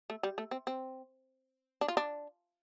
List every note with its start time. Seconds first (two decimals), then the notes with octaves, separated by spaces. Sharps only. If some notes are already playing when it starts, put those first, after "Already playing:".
0.10 A3
0.23 G3
0.38 A3
0.51 C4
0.67 C4
1.81 D4
1.88 F4
1.97 D4